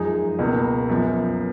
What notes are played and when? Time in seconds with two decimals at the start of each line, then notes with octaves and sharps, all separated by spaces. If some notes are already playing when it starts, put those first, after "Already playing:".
Already playing: F#2 F3 G#3 D#4 G#4
0.39 C#2 B2 A#3
0.89 F#2 F3 B3